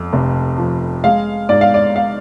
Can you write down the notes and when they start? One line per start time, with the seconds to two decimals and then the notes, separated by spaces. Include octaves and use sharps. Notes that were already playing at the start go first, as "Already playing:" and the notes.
Already playing: F2
0.13 F1
0.58 F3
1.04 G#3 F5
1.49 G#2 D5
1.61 F5
1.74 D5
1.96 F5